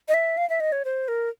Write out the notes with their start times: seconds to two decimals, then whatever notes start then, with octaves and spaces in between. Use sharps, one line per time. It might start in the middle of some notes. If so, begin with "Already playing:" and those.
0.08 D#5
0.14 E5
0.37 F5
0.50 E5
0.60 D#5
0.72 C#5
0.85 C5
1.08 A#4